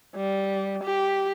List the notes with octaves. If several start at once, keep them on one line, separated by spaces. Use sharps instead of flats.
G3
G4